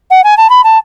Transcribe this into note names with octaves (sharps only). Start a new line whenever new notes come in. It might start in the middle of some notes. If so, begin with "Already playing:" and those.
F#5
G#5
A5
B5
A5